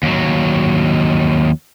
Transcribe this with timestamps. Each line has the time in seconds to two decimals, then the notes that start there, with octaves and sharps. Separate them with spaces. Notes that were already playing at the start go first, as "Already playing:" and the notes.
0.03 D#2 F#3